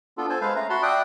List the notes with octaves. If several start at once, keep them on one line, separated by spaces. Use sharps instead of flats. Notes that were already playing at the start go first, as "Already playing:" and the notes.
B3 D4 F4 A4
A4 C5 G#5 A5
G#3 B4 C5 F5
A3 C#4 A#5
F#4 F#5 A5 B5 C6
D5 E5 G5 D#6 F#6